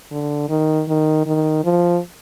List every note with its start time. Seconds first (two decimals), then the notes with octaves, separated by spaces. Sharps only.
0.11 D3
0.49 D#3
0.88 D#3
1.26 D#3
1.64 F3